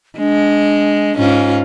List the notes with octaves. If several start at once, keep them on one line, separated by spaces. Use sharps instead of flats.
G#3 D4
G#2 C#4 F4